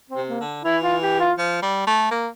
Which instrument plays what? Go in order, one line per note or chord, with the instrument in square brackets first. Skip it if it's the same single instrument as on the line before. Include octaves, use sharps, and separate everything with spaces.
[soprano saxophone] C4
[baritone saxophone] C3
[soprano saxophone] A#3
[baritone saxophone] D3
[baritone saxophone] E3 [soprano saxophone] E4
[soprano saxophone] F4
G4
F4
[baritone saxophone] F3
G3
A3
A#3